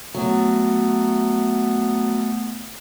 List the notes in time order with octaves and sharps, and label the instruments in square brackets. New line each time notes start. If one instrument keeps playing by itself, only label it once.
[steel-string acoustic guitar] F#3 [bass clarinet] A3 [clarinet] B3